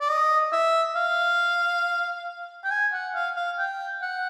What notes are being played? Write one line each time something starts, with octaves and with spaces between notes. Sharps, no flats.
D5
D#5
E5
F5
G5
G#5
F#5
F5
F5
G5
F#5